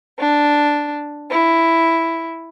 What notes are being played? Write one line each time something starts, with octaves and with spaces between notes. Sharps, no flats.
D4
E4